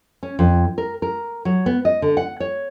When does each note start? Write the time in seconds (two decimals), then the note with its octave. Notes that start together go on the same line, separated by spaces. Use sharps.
0.23 C#4
0.39 F2
0.78 A#4
1.02 A#4
1.45 F#3
1.66 B3
1.85 D#5
2.02 D3
2.17 F#5
2.40 C#5